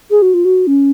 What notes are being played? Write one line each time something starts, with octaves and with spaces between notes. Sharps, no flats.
G#4
F#4
F4
F#4
C#4